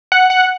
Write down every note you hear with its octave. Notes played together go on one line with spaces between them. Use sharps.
F#5
F#5